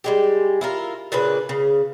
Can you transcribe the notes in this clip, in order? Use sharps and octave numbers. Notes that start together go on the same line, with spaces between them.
G3 G#3 G4
E4 F4 A#4
A#2 C#3 D4 B4
C#3